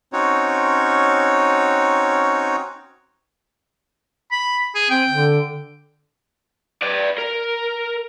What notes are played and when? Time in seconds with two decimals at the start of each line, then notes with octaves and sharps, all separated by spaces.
0.13 C4 C#4 D#4 F#4 C#5
4.31 B5
4.75 G#4
4.90 C4 G5
5.09 D3
6.82 B4 D5
7.19 A#4